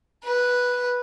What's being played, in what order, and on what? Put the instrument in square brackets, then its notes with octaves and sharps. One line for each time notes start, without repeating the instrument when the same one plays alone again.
[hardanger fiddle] B4